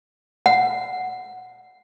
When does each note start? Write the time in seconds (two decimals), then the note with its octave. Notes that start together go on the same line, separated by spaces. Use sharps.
0.46 F#5